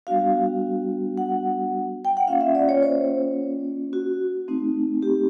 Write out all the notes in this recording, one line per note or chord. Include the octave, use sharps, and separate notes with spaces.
G3 B3 D4 F#4 F5
F#5
G5
F#5
A#3 C#4 F4 F5
E5
D5
C#5
C5
F#4
A3 C4 D#4
G4